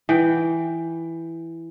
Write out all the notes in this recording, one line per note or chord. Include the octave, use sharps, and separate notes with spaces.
E3 G5